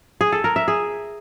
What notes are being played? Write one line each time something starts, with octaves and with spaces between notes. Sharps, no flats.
G#4
A4
A#4
E5
G#4